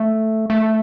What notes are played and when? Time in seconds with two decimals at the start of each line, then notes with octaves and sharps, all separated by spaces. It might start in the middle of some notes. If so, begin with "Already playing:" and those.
Already playing: A3
0.50 A3